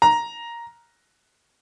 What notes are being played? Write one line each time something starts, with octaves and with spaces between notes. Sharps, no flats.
A#5